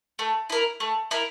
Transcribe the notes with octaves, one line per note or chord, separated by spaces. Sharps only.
A3
E4 A#4
A3
E4 A#4